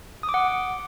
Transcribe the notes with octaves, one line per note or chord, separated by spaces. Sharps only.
D#6
D6
F#5